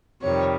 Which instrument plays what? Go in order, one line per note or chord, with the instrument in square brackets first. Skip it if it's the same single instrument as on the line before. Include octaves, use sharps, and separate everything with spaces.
[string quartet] F2 C3 D#3 G3 C#5